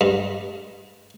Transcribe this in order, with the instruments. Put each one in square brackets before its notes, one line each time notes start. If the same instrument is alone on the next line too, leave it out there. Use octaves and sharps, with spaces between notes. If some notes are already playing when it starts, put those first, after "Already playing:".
[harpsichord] G2